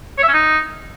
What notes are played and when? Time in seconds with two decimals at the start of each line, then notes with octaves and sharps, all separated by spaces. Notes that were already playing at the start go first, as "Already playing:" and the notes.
0.18 C#5
0.23 E5
0.28 C#4
0.34 D#4